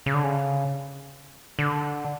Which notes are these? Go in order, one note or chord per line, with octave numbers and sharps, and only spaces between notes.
C#3
D3
C#3
D3